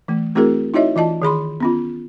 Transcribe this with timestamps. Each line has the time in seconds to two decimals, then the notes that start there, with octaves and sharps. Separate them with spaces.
0.08 E3 A3
0.35 A3 C4 E4 F#4 G#4 A#4
0.74 D#4 E4 F#4 C#5 D#5 E5
0.96 E3 F4 D#5 A5
1.22 D#3 G#4 B5 C6
1.60 B3 C#4 F4